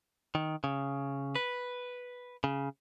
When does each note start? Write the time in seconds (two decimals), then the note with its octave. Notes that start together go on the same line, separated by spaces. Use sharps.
0.35 D#3
0.64 C#3
1.35 B4
2.44 C#3